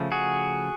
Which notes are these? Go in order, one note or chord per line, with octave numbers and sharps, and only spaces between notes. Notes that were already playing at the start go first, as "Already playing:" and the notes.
Already playing: C#3 F3 A3
F#4 G#4